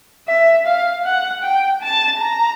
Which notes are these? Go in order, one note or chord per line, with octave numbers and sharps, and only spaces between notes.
E5
F5
F#5
G5
A5
A#5